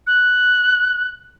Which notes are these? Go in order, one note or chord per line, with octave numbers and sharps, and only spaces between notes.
F#6